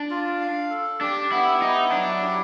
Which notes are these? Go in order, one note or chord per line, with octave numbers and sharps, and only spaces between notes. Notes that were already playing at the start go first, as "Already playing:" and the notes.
Already playing: D4
F4
F5
A4
D4 G4
B3 E4
D#4 E4
F#3 D4
G4